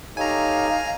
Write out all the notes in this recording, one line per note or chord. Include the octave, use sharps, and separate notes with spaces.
D#4 G4 A4 C#5 F5 G#5 A#5